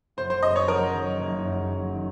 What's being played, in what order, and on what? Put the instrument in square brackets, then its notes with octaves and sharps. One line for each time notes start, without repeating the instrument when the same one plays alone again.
[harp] F#1 [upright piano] C5
[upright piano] C5
[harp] F#2 [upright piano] D#5
[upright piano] C#5
[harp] F#3 [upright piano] A#4
[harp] D#3
F#1
F#2
F#3
D#3